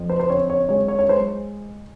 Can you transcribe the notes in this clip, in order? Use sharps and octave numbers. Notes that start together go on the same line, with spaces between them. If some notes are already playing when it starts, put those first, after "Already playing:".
Already playing: F2
C5
C5
C4 C#5
C#5
G#3 C#5
C#5
C#5
G#3 C5